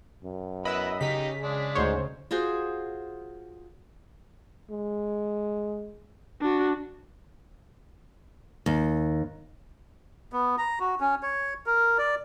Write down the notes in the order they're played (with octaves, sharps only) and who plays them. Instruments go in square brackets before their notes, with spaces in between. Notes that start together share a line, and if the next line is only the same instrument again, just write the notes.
[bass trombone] F#2
[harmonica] B3 E4 B4 [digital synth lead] D#5 [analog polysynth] B5 E6
[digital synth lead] C#3 [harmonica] D#4 G4 D#5 [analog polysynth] B6
[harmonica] G#3 D4
[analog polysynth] D2 C5 C#5 [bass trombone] G#2
[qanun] F4 F#4 G#4 C5
[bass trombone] G#3
[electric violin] D4 F#4
[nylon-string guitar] D#2
[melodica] B3
A#5
F#4
C#4
C#5
A#4
D5